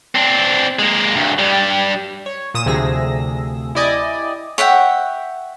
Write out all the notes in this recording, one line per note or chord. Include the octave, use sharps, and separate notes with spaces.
C4 D4
G#3 A#3
D2 G2
G2 G3
C#5
A#2 D#6 E7
D2 C3 F3 G#4 E6 A#6
E4 G4 D5 D#5 G#5
C#5 E5 F#5 G5